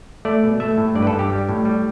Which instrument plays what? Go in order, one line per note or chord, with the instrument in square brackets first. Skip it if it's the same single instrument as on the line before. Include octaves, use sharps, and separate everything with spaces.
[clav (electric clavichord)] A3 D5
B2
A3 E5
A2
G2 D5
B4
A4
G2
G4
G3
A2
G3